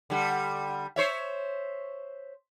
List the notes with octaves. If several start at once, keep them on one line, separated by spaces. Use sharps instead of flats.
D3 G3
C5 C#5 E5